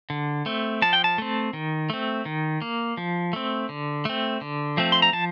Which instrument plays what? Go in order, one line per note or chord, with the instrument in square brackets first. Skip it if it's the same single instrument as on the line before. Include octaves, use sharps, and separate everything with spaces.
[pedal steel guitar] D3
A3 C4
F3 A5
G5
A5
A3 C4
D#3
A3 C4
D#3
A#3
F3
A3 C4
D3
A3 C4
D3
F3 A3 C4
C6
A#5
F3 A5